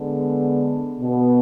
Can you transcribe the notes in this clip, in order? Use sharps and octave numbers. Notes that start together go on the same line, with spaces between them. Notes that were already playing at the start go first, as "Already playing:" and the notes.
Already playing: D3 G#3 B3
B2 B3